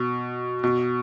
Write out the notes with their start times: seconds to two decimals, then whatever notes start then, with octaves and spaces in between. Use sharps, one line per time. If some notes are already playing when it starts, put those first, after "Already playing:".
Already playing: B2
0.64 B2